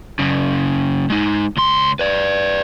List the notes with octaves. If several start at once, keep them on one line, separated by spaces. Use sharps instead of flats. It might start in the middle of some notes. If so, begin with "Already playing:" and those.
F#2 C#3
G#3 D#4
C#2 C6
B4 D5